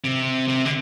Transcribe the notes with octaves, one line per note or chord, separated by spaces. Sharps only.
C3
C3
D3